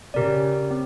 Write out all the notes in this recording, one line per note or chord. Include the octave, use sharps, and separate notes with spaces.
C#3 G4 A#4 D5
C4